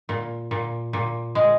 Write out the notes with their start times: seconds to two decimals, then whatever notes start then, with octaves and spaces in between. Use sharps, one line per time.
0.09 A#2
0.51 A#2
0.93 A#2
1.35 G#3